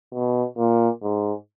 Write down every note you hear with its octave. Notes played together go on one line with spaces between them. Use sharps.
B2
A#2
G#2